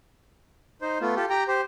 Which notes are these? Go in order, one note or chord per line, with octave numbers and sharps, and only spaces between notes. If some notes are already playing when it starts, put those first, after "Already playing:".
D#4 C5
A3 B3 F4
F4 G4 A4
G4 G5 A#5
G4 C5